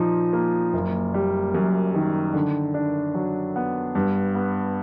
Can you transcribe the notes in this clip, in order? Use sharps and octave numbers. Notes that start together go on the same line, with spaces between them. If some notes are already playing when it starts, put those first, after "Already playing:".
Already playing: A#2 F3 D#4
A#3
F#1
G3
F#2
D#3
D3
D4
F#3
B3
G2
B3